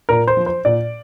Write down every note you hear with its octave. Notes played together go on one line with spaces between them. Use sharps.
A#2 A#4
C5
F3
C5
A#2 D5